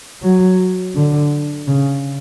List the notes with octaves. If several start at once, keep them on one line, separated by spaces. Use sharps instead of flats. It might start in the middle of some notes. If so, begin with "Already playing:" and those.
F#3
D3
C#3